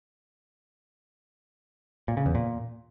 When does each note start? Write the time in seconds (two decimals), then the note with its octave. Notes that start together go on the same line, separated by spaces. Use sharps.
2.08 A#2
2.17 C#3
2.26 E2
2.35 A#2